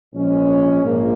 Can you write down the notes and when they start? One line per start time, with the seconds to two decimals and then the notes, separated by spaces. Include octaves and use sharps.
0.14 A#1 A#2 F3 G#3 C#4
0.84 A#1 G#2 F3 A#3